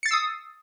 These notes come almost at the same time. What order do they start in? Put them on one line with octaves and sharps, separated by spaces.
C#7 A6 C7 E6 D#6